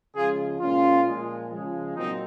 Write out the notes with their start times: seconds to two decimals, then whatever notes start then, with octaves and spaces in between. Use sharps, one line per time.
0.14 C#3 F3 G#3 F4 G#4
0.59 A#2 G#3 C#4 F4
1.05 A#2 F3 G#3
1.50 C#3 F3 G#3
1.96 A#2 F#3 C4 D#4